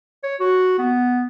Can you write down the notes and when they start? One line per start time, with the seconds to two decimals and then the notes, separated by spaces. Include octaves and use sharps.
0.24 C#5
0.40 F#4
0.79 B3